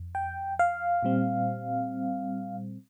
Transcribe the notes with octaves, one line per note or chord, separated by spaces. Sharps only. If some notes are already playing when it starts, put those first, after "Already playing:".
Already playing: F2
G5
F5
A#2 G3 C4